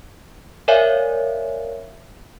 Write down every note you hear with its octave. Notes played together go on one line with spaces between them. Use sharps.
A#4 C#5 D5 E5 F5 G#5